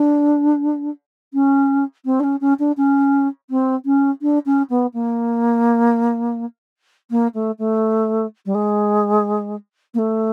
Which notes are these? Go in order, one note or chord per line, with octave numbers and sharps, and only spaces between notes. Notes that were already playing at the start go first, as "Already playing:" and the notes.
Already playing: D4
C#4
C4
D4
C#4
C#4
D4
C#4
C4
C#4
D4
C#4
B3
A#3
A#3
A3
A3
G3
G#3
A#3
A3